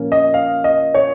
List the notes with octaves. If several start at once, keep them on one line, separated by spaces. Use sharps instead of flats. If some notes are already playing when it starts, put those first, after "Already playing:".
Already playing: A#2 F3 A#3 C#4
D#5
F5
D#5
C#5